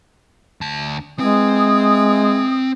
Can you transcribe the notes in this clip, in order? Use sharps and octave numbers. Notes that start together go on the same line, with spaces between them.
D2 A5
E3 G#3 C4 G#5 D#6